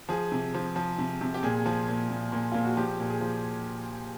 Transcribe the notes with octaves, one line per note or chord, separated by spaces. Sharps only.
F3 G#4
C3
F3
F3
C3
C3
G4
A#2 G#4
F3
A#2
A#2
A#2
A#2 F4
F#4
F3 G4
A#2
G#4
F3